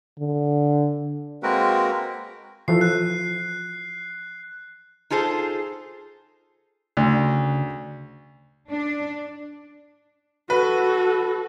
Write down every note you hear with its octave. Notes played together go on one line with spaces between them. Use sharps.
D3
G#3 A#3 C4 F#4 A#4 B4
E3 F3 A4 C7
F#6
D#4 F4 G#4 A4 C5
D2 C#3
D4
F#4 A4 B4